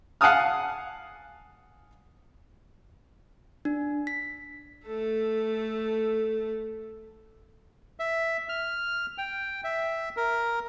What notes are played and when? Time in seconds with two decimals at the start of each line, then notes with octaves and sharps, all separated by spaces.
0.21 F5 F#5 G#5 A5 D#6 F6
3.65 D4
4.07 B6
4.86 A3 A4
8.00 E5
8.49 F6
9.18 G5
9.64 E5
10.17 A#4